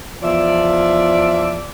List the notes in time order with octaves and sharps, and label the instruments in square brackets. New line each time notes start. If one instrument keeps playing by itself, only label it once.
[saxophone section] E2 F3 D5 E5